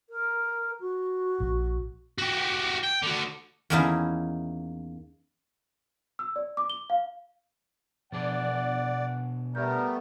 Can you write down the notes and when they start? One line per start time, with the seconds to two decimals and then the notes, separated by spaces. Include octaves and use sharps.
0.09 A#4
0.80 F#4
1.40 A#1
2.18 F#4 G4
2.84 G5
3.03 D3 F#4
3.70 E2 A#3 C#4 D#4 E4 A5
6.19 E6
6.36 D5
6.57 D6
6.70 G7
6.90 F5
8.12 B2 F3 D4 G#4 D5 F#5
9.55 G3 A3 B3 A#4 E5 G6